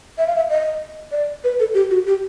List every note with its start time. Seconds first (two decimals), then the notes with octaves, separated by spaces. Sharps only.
0.18 E5
0.27 F5
0.36 E5
0.50 D#5
1.12 D5
1.44 B4
1.60 A4
1.74 G4
1.91 F#4
2.07 G4